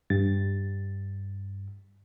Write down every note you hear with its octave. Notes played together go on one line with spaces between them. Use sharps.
G2 A6